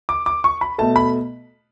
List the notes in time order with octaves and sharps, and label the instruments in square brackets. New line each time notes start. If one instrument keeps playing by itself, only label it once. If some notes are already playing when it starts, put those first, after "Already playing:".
[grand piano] D6
D6
C#6
B5
B2 A3 A5
B5